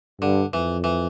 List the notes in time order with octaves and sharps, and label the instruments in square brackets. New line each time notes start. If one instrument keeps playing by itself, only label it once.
[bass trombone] G2 [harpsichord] D3
[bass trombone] F2 [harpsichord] E3
[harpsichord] E3